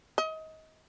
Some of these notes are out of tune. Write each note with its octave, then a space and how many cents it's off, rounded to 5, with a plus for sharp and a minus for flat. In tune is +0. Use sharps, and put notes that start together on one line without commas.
D#5 +25